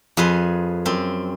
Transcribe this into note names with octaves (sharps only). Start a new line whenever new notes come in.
F2 G#4 B4 C6
F#2 C4